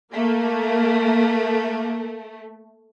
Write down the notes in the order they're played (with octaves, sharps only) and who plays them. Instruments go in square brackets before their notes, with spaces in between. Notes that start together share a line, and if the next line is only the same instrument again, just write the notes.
[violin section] A3 [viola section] A#3